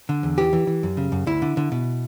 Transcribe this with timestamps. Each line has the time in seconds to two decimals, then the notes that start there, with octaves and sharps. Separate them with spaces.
0.09 D3
0.23 E2
0.38 E3 G4
0.53 E3
0.67 E3
0.83 F#2
0.97 C#3
1.12 F#2
1.27 D2 E4
1.42 D3
1.57 D3
1.72 B2